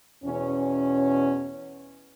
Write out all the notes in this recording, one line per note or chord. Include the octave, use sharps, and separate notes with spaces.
E2 B2 C#4